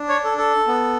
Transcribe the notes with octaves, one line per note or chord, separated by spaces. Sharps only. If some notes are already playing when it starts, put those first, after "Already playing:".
Already playing: D4
C#5
A4
A4
B3